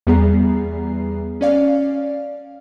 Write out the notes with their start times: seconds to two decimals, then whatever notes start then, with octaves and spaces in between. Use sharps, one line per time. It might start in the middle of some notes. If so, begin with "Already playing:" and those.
0.07 E2 G3 B3 G#4 A#5 C7
1.41 C#4 D5 F5